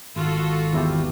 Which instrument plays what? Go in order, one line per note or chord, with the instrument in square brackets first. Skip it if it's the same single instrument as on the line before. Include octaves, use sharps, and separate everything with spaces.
[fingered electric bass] G#1 [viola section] F4 F#4 A4
[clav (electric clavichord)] E2 E4 G4